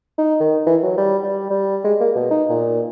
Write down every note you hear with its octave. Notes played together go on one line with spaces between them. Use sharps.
D#4
D#3
E3
F#3
G3
G3
G3
G#3
A#3
B2
D#4
A#2